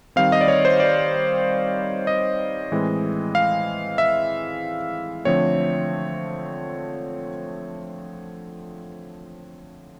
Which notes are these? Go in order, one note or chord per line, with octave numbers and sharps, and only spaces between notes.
D#3 G3 C4 F5
D#5
D5
C#5
C5
D5
D#5
A2 E3 G#3 C4
F5
E5
D3 F3 A3 C4 C#5